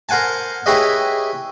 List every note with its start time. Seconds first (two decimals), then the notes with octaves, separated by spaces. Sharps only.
0.09 A#4 C5 F#5 G#5 A5
0.66 E4 G4 G#4 B4 C#5 D#5